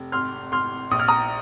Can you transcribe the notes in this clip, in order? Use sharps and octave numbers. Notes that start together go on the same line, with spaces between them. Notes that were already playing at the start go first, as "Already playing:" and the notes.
Already playing: F1
G#1 C6 F6
G#1 C6 F6
A#1 D#6
F6
A#5 D#6